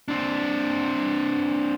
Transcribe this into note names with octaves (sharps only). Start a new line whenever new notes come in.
C4 D4